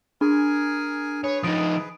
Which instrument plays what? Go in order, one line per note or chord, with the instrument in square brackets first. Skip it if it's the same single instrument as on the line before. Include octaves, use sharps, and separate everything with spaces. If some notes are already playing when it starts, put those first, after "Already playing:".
[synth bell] D4 [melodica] G#4 A#4 G#5
[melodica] G#4 B4 [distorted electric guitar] C#5
[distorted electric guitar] F3 D#4 [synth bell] D#6 D7